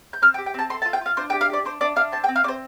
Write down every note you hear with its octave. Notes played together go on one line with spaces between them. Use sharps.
G6
C4 F6
G5
G4
G5
C4 A5
A4 C6
A5
F4
G5
F4 F5
D4 C5
G5
G4
F5
G4 D5
D4 C5
D4 D5
D4 F5
C4 A5
G5
C4
F5
C4 D5
C5